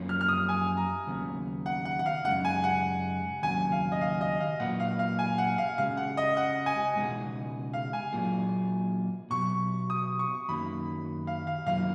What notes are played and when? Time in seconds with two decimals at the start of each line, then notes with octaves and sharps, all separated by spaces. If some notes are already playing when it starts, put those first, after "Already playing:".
Already playing: F#2 F3 A#3 C#4
0.09 F6
0.21 F6
0.28 D#6
0.49 G#5
0.77 A#5
1.07 D#2 C#3 F#3 B3
1.66 F#5
1.85 F#5
1.99 F#5
2.06 F5
2.24 F#2 C#3 G#3 D#4 F#5
2.45 G#5
2.64 F#5
3.42 D#2 C#3 F#3 G#5
3.72 F5
3.92 D#5
4.01 F5
4.21 D#5
4.41 F5
4.60 A#2 F#3 A#3 F4 B4 F#5
4.80 F5
4.99 F5
5.19 G#5
5.38 F#5
5.58 F5
5.78 C#3 G#3 C#4 F#4 F5
5.97 F#5
6.17 D#5
6.37 F#5
6.66 G#5
6.96 C#2 B2 G#3 D#4 G#4
7.74 F5
7.93 G#5
8.13 A#2 F#3 A#3 F4 G#4
9.30 B2 F#3 B3 C#6
9.90 D#6
10.19 C#6
10.48 F#2 D#3 F#3 A#3 B5
11.27 F5
11.47 F5
11.67 F#2 D#3 F#3 A#3 F4 F5